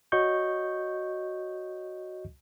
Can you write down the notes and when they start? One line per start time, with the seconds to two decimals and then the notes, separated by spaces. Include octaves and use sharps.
0.12 F#4 C#5 D#5 C#6 G6